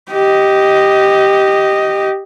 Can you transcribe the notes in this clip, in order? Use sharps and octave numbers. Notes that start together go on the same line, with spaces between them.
G4 D#5